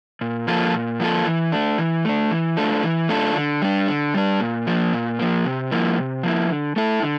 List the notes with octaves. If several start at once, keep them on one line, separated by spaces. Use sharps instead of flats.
A#2
F3 A#3 F4 A4
A#2
F3 A#3 F4 A4
E3
A3 D4
E3
A3 D4
E3
A3 D4 F4 A4
E3
A3 D4 F4 A4
D3
G3 D4
D3
G3 D4
A#2
F3 A#3
A#2
F3 A#3
C3
F3 A#3 E4
C3
F3 A#3 E4
D3
A3 E4 A4
D3